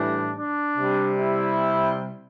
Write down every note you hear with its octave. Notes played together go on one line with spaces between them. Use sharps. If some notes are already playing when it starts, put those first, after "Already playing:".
Already playing: A2 E3 G3 D4
D4
C3 G3
E4